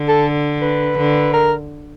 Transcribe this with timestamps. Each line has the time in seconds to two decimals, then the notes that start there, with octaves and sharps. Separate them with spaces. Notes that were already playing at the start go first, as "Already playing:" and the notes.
Already playing: D3
0.08 A4
0.62 B4
0.97 D3
1.33 A#4